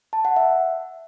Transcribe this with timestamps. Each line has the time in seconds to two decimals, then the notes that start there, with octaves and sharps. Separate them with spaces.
0.13 A5
0.25 F#5
0.37 E5